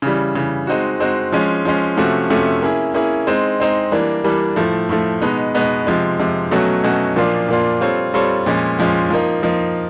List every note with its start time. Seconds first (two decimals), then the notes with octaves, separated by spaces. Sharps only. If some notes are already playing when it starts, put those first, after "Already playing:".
0.02 C#3 E3 G3
0.35 C#3 E3 G3
0.67 G#3 C4 D#4 F#4
1.00 G#3 C4 D#4 F#4
1.32 F3 G#3 C#4
1.65 F3 G#3 C#4
1.97 C3 F3 A3 C#4 F#4
2.30 C3 F3 A3 C#4 F#4
2.62 A#3 C#4 E4 G#4
2.94 A#3 C#4 E4 G#4
3.27 G#3 C4 D#4
3.60 G#3 C4 D#4
3.92 E3 G3 A#3 D4
4.24 E3 G3 A#3 D4
4.56 A2 F3 A3
4.89 A2 F3 A3
5.22 B2 G#3 B3 D#4
5.54 B2 G#3 B3 D#4
5.87 C3 F3 G#3
6.19 C3 F3 G#3
6.51 B2 F#3 A3 C#4 F#4
6.84 B2 F#3 A3 C#4 F#4
7.16 A#2 F3 A#3 D4 F4
7.48 A#2 F3 A#3 D4 F4
7.80 G3 C4 F4 A4 C#5
8.14 G3 C4 F4 A4 C#5
8.46 A#2 F3 G#3 C#4
8.79 A#2 F3 G#3 C#4
9.10 F3 A#3 D#4
9.43 F3 A#3 D#4